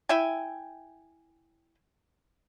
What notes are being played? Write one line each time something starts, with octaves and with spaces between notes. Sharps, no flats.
E4 E5 G5 G#5